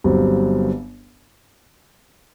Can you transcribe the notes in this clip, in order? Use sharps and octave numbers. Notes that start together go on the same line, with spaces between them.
G1 G2 F#3 C4